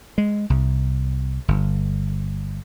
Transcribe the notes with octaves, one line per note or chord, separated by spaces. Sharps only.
G#3
C2
G1